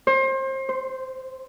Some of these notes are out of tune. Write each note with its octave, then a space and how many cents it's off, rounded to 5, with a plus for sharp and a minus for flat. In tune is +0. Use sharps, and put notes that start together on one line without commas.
C5 +30
C5 -10